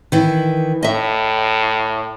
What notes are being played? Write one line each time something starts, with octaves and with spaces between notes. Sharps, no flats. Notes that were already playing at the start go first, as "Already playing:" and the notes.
D#3 E3
A2 D#5 E5